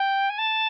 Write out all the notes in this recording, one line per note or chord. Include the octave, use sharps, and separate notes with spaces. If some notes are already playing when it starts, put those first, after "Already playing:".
Already playing: G5
G#5
A5